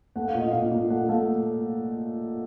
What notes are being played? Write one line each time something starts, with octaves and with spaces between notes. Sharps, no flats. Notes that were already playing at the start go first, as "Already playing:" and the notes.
A3 F#5
F5
A#2 D#5
A#2 F5
A#2
A3 F#5
A3 F5